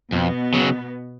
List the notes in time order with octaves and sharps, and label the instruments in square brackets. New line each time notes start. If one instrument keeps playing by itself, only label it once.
[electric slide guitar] F2 [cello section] B2 B3
[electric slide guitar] C#3 F#3